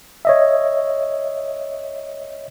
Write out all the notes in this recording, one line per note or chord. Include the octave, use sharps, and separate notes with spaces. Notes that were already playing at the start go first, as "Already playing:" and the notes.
C#5 D#5 E5